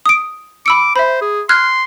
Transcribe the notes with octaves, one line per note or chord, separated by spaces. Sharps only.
D#6 D7
B5 D6 E6 C#7
C5 E5 B5
G#4
C6 F6 F#6 G#6